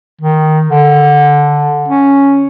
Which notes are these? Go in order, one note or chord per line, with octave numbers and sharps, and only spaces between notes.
D#3
D3
C#4